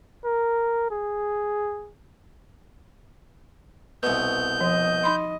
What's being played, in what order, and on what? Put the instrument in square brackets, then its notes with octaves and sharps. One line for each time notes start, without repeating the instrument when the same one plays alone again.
[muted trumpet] A#4
G#4
[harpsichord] C2 B2 [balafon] B4 [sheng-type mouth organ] G6
[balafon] F3 [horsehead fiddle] D#5
[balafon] D#4 B5 C6